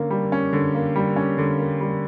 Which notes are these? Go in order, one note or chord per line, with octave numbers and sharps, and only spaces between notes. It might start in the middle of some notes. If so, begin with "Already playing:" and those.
Already playing: D3 A#3 C#4
G3
C#4
D3
A#3
G3
C#4
D3
A#3
G3